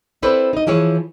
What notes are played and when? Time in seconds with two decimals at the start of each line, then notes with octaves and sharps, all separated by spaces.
0.22 C4 E4 A4 B4 C5 D5
0.53 D#4 D#5
0.67 E3 F3 E4 G#4 B4 C#5